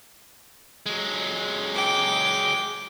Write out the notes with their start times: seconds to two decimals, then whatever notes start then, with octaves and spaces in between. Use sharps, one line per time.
0.86 F#3 G#3
1.75 G5 D6